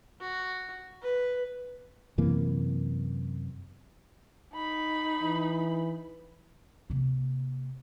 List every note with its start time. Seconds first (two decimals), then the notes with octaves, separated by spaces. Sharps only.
0.21 F#4
1.02 B4
2.18 F#2 C3 E3 A#3
4.54 D#4 B5
5.23 E3
6.90 C3 A#3